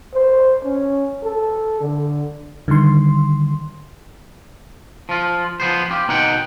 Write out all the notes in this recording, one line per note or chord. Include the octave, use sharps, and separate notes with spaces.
C5
C#4
A4
D3
D3 D#3 G3 C6
F3 F4
F3 B3 C5
F4 G4
B2 D#4 F#5 G5